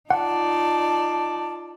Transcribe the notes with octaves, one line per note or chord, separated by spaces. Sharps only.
D#4 F4 D5 F#5 A5